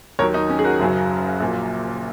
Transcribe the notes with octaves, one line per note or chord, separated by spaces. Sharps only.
D#2 D#3 F#3 A#4 C#5
D#4
C#4
G#4
F#4 A#4
F#1 F#2 C#3 F#3
A#1 A#2 F#3